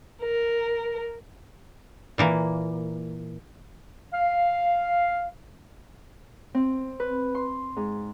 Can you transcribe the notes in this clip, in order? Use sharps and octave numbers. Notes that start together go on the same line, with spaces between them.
A#4
A#2 E3 A#3
F5
C4
B4
C6
G#2